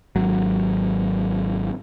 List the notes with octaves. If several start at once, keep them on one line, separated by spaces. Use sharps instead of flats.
G#1 F#3